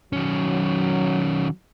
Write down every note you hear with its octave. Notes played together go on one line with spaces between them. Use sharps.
D#3 F#3 C#4